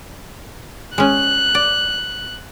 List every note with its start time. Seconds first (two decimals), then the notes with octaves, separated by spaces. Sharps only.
0.98 G#3 C#4 F#6
1.55 D5